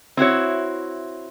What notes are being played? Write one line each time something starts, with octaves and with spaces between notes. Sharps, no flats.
C4 E4 F#4 C#5